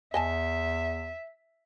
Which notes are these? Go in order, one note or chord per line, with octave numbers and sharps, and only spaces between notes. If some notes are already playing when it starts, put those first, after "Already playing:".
E2 D#5 E5 G#5 A5